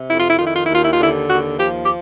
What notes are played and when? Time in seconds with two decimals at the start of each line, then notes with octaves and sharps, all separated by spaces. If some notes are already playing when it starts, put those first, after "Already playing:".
Already playing: C3
0.10 F2 E4
0.20 F4
0.29 E4
0.38 D#3 F4
0.47 E4
0.56 F4
0.66 D#2 E4
0.75 F4
0.85 E4
0.93 F4
1.00 D3 E4
1.30 D#2 F#4
1.58 F3 G4
1.83 G4